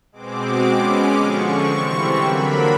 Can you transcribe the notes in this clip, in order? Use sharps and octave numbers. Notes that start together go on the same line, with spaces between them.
B2 G#3 C4 D6
B2 G#3 C#4
D3 F3 G#3 C#6
C3 E3 G3 C4
D3 F#3 A#3 D4 B5